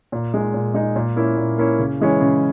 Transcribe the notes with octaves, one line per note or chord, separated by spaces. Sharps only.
A#2
G#3 D#4
A#2
G#3 D#4
A#2
A#3 C#4 E4
A#2
A#3 C#4 E4
C#3
E3 G#3 C#4 E4
C#3